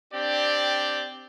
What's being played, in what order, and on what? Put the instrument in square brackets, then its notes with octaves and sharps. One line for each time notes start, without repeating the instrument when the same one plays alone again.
[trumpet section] C4 D4 G4 D5